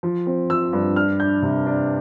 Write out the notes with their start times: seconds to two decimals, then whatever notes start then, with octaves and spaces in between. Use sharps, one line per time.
0.03 F3
0.26 C4
0.50 F3 E6
0.73 G2
0.96 D4 F6
1.20 D4 G6
1.42 C3
1.66 D4